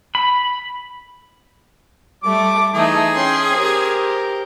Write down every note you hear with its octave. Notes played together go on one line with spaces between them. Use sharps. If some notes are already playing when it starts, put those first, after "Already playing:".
B5
G3 A3 D6
E3 A3 D#4 G#4
C#4 G5 C6
G4 A#4 C5